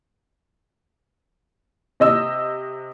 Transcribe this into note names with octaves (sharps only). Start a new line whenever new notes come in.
C3 D#5 E6